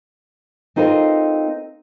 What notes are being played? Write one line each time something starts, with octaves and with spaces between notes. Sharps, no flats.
C4 D#4 F4 A4 A#4 C5